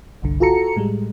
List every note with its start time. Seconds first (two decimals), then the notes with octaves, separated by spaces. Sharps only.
0.22 G1 C2 D3
0.40 F4 F#4 A4 A#5 C#7
0.76 A2 G3 G#3